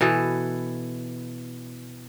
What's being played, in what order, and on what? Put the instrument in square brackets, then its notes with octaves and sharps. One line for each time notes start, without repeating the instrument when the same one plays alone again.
[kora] B2 E3 A4